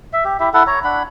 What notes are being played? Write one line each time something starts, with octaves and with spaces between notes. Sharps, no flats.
E5
G4
E4 G4 E5
E4 A4 F#5
C#5 A#5
D4 F#5 B5